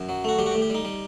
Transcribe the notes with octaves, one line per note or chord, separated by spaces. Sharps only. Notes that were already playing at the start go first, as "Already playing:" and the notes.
Already playing: F#2
F#3
A3 F#4
G3 G4
F#4
G4
A2
G4
G3 D#4
G3